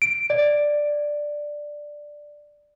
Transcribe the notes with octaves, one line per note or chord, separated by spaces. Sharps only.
D7
D5